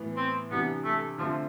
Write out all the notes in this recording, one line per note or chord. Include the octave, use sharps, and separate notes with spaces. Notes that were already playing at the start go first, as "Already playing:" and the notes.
Already playing: A2 E3 B3 E4
C4
C3 E3 G3 B3 D4
A3
D3 F3 A3 C4 F4